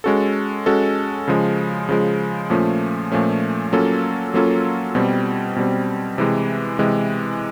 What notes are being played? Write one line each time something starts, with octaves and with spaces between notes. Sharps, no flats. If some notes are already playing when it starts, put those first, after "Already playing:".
G#3 C#4 F#4 A4
G#3 C#4 F#4 A4
C#3 F3 G#3
C#3 F3 G#3
A#2 F3 A3 C#4
A#2 F3 A3 C#4
F#3 A#3 C#4 F4 A4
F#3 A#3 C#4 F4 A4
B2 G3 C4
B2 G3 C4
C3 E3 G#3
C3 E3 G#3